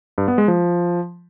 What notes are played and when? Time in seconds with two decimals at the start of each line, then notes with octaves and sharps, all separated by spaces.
0.18 G2
0.28 B3
0.38 G#3
0.48 F3